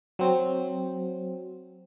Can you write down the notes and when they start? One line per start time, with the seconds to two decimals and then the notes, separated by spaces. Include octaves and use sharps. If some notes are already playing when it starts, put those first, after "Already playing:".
0.19 F#3 C4